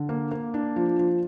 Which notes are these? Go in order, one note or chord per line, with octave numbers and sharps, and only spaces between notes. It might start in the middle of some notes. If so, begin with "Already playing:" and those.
Already playing: D3
A#3
A#3
D4
F3
F3